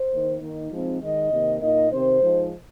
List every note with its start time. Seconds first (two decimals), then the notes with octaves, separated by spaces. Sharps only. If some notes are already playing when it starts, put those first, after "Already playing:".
Already playing: C5
0.11 D#3 A#3 D#4
0.41 D#3 A#3 D#4
0.71 F3 G#3 C4 D#4
1.02 D#3 G#3 D#4 D#5
1.31 C3 D#3 A#3
1.61 A#2 A#3 D#4 D#5
1.91 C3 D#3 C4 C5
2.21 F3 G#3 D#4